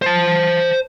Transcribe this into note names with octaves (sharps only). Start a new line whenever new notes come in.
C5 A5